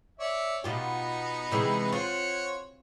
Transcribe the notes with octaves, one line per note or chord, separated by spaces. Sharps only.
C#5 D5 E5
B2 B3 D#4 F4 G4
C3 E3 G#3
F4 F#4 C5 C#5